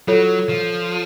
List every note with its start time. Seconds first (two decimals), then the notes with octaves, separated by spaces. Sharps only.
0.08 F#3 F4 A4 C#5
0.49 F3